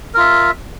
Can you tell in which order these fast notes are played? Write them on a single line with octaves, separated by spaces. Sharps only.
A#4 F4 E5